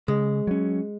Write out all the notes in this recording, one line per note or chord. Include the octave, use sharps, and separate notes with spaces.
C#3 G#3
F#3 C#4